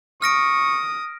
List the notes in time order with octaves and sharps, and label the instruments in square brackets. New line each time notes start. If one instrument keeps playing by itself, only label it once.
[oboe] C#6 [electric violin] D#6 [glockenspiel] F6 A#6 D7